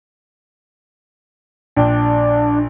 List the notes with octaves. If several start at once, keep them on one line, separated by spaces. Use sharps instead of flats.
A#1 D4 G5